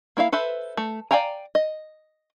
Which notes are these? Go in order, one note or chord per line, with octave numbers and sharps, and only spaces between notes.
A#3 E4 E5 F5
A4 B4 C5 E5
A3
D5 F5 G5 G#5 A#5
D#5